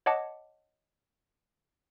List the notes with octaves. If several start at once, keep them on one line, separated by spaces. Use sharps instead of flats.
C#5 D#5 F#5 A5 D6